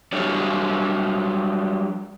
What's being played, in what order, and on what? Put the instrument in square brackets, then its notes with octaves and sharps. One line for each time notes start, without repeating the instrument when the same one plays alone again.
[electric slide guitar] F#3 G3 D4 G4 C#5 D5